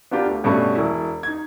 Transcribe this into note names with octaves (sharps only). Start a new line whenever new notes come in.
B3 D4 F4 G4 A#4
D2
G2 B2 G3 A3 C#4
E1 E4
D#4 G#6